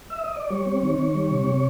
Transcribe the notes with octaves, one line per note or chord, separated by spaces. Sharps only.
E5
D#5
D5
G3 C#5
C4
D#3
D#3
G3
C3
C3